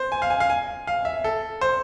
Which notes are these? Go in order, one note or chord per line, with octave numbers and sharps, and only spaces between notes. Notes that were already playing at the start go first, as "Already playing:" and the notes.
Already playing: C5
G#5
F5
G#5
F5
G#5
F5
E5
A4
C5